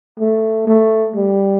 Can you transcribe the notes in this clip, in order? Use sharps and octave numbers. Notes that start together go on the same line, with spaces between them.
A3
A3
G3